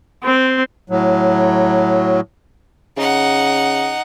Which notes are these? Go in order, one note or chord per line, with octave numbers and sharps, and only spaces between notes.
C4
A2 F#3
C#3 D#4 F#5